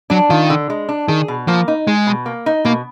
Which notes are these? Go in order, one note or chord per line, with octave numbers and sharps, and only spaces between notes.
F#3 D4
D#3 F4
D3
G#3
D4
D#3 G#4
B2
F3 A#3
D#4
G#3 G#4
B2
A#3
D#4
B2 A#3